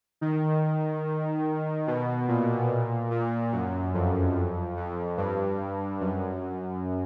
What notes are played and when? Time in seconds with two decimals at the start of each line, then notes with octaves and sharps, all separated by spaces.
0.21 D#3
1.87 B2
2.28 A#2
3.11 A#2
3.53 F#2
3.94 F2
4.77 F2
5.17 G2
6.01 F#2